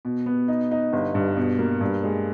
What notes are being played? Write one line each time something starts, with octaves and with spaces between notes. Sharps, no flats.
B2
B3
D#4
D#4
G1
G2
B2
A#3
G2
G#3